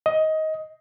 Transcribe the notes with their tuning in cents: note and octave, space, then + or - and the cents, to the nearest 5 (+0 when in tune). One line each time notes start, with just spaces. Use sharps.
D#5 +15